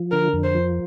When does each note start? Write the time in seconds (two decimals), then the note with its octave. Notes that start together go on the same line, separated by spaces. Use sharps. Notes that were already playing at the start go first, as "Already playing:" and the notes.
Already playing: F3
0.11 D3 A#4
0.34 F2
0.44 C5
0.55 F3